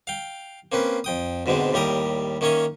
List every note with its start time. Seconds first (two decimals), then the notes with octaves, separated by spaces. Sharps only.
0.07 F5 G5
0.72 A#3 C4 C#4 B4
1.04 F2 G5 D#6
1.46 D2 G#2 B2 D3 G#3 C4
1.73 D#2 A2 G3 G4 A#4 D#6
2.41 D#3 A#3 C#4 C#5 D#5 E5